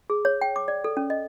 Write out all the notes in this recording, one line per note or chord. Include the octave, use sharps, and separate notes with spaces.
G#4
C#5
G5
D6
D5
A4
C#4
D#5